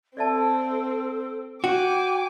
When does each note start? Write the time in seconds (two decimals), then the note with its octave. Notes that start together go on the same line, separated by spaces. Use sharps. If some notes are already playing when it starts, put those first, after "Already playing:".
0.17 C4 A4 D5 E5 A5
1.64 F#4 G5 G#5 D6